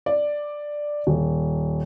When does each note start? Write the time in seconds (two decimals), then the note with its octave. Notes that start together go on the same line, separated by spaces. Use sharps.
0.06 D5
1.07 D#1